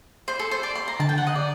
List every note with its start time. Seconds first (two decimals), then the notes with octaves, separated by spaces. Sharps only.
0.28 C5
0.39 A4
0.51 C5
0.63 D5
0.75 C6
0.88 A#5
1.00 D3 A5
1.09 G5
1.18 F#5
1.27 D#5
1.35 D5